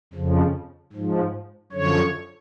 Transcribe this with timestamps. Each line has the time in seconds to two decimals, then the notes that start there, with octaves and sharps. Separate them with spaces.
0.13 F2 C#3 F3
0.93 G#2 F3
1.72 F#2 D3 F3 C#5